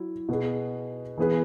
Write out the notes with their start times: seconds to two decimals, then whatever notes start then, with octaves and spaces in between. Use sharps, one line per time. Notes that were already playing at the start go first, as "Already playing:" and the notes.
Already playing: F#3 E4
0.29 B2 B3 G#4
1.18 E3 B3 G#4 B4